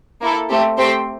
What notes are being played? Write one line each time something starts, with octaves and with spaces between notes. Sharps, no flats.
A#3 E4 A4
A3 C4 G4
A3 C4 G4 C5 G5